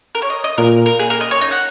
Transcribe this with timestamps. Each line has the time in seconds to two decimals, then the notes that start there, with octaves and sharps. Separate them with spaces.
0.15 A#4
0.22 C#5
0.30 D#5
0.44 D#5
0.58 A#2 A#4
0.86 A#4
0.99 G#4
1.10 A#4
1.21 D#5
1.31 C#5
1.41 D#4
1.51 F#4